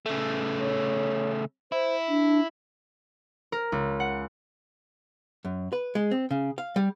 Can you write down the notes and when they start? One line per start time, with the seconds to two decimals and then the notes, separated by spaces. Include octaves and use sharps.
0.06 C#3 A3
0.59 C#5
1.72 E4 C5
2.08 D4
3.52 A#4
3.72 C#2
4.00 F#5
5.45 F#2
5.73 B4
5.95 G#3
6.11 C4
6.31 C#3
6.58 F5
6.76 G3